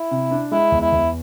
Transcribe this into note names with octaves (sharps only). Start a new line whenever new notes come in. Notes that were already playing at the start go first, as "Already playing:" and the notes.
Already playing: E4
C3
D4
G#3 E4
E2
E4
E2